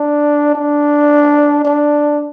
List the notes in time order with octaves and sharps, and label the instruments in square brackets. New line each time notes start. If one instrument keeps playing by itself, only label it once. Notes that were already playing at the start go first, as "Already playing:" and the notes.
Already playing: [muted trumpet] D4
D4
D4